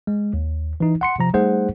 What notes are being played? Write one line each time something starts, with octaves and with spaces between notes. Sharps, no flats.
G#3
D#2
E3 D#4
F#5 C6 C#7
C3 F3 A#5
G3 A3 D#4 G#4 C5 F#5